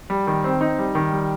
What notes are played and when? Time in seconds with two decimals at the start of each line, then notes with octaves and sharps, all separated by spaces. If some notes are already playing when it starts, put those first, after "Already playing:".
0.10 G3
0.27 D#3
0.44 C4
0.61 D#4
0.79 G3
0.95 D#3
1.12 G3